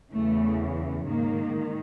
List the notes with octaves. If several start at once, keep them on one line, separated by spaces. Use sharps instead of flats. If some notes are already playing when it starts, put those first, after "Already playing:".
E2 C#3 E3 A3
G#2 D#3 A#3